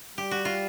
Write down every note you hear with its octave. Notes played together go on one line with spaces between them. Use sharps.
G3 G4
F#4
F4